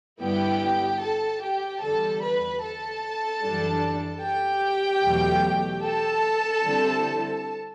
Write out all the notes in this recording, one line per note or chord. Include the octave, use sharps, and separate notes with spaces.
G2 D3 G3 B3 E4 G4 G5
A4 A5
G4 G5
E2 D3 G3 A4 A5
B4 B5
A4 A5
F#2 E3 G3 D4
G4 G5
E2 B2 F#3 A3
A4 A5
D3 G3 C4 E4